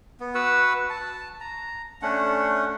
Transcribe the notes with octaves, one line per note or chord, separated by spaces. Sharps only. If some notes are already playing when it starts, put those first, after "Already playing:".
B3
F#4 B4 F#5 E6
A5
A#5
A3 C#4 D4 F#5